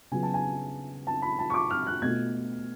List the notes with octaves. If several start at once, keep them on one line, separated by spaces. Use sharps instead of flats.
C#3 F#3 B3 F4 G#5
A5
G#5
A5
B5
A5
C#6
D6
F6
F#6
B2 A3 F4 G#6